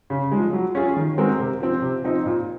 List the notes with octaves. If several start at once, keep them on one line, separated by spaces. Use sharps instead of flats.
C#3
F3 G#3
F#3
C#4 F4 G#4
D#3
G#3 C4 F#4 A#4
C3
F3 C4
C3
F3 C4 D#4
A#2